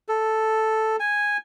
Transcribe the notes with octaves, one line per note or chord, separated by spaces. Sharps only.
A4
G#5